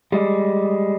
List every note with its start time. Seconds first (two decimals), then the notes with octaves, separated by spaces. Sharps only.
0.12 G3 G#3